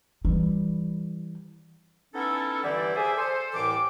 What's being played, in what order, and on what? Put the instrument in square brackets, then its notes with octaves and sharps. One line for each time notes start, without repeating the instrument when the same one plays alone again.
[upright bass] E3 G3
[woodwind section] B3 C#4 D#4 E4 A4
G2 D3 E3 G3 E4 D5
G#4 A4 C5 D5 E5 G#5
A4 C5
C2 A2 E3 D6